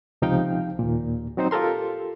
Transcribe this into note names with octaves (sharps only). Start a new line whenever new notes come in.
C#2 C3 F3 D#4 F5 G5
D#2 A#2
F#3 C4 D#4 C5
F4 G4 A4 A#4 C6